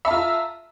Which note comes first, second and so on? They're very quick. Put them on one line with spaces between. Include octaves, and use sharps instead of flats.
E5 A5 F4 A#5